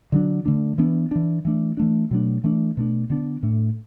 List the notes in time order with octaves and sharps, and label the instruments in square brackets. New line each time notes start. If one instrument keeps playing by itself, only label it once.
[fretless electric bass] D3 F#3 D4
D3 A3 D4
E3 B3 D4
E3 D4
E3 A3 D4
E3 A3 D4
B2 F#3 A3 D4
E3 A3 D4
B2 A3 D4
D3 B3 D4
A2 A3 D4